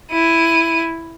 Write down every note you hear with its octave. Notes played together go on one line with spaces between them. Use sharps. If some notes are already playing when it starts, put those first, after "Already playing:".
E4 D#7